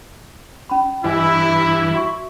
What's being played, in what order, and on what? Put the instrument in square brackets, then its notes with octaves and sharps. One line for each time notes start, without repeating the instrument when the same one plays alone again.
[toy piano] C#4 B5
[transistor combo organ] G2 E3 [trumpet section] E4 [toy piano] B4 D#5 G#5
[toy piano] E6
F#4 E5 C#6